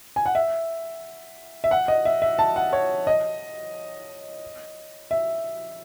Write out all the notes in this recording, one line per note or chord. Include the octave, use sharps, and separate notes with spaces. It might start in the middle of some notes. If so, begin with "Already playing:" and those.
G#5
F#5
E5
E5
F#5
D#5
E5
E5
A5
F#5
C#5
D#5
E5